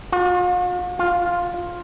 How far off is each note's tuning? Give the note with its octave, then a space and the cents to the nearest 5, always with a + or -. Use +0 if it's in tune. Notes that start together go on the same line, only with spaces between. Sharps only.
F4 +45
F4 +5